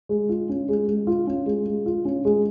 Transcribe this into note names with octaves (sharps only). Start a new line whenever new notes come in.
G#3
F4
C#4
G#3
G#3
F4
C#4
G#3
G#3
F4
C#4
G#3